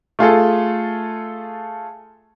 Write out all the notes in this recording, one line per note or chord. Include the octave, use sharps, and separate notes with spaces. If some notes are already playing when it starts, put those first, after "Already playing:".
A3 F4 G#4 A4